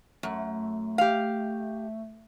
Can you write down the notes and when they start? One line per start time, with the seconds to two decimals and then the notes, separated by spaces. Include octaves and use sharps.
0.23 F#2 A3
0.98 G4 F5